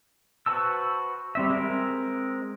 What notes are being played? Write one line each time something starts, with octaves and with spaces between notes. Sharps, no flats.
F#4 B4 C5 A5 E6
G3 C4 E5
G#3 C4 A#4